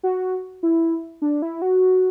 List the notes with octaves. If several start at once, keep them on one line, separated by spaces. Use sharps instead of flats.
F#4
E4
D4
E4
F#4